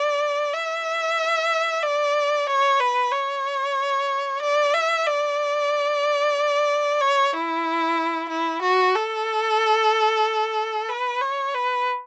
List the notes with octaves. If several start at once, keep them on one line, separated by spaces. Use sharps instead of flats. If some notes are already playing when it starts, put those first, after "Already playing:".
Already playing: D5
E5
D5
C#5
B4
C#5
D5
E5
D5
C#5
E4
E4
F#4
A4
B4
C#5
B4